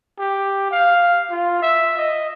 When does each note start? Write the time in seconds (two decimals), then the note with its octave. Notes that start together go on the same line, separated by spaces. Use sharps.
0.19 G4
0.71 F5
1.30 F4
1.62 E5
1.97 D#5